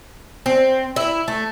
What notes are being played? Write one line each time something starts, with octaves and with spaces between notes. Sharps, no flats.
C4
E4
A3